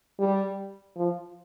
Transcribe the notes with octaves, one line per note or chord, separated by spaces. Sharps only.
G3
F3